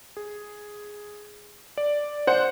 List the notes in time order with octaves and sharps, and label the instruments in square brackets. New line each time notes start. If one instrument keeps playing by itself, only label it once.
[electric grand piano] G#4
D5
[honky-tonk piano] C5 F#5